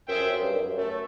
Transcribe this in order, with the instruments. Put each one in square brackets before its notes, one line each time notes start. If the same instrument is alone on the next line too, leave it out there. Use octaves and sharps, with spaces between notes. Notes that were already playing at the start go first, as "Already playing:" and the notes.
[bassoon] F#2 [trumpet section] F4 G#4 C5 E5 G5
[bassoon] F#2
F#2
G2
F#2
F#2
[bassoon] F#2 [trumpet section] A3